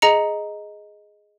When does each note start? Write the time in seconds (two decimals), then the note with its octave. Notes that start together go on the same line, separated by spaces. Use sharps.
0.02 G#4 D#5 A#5 C#7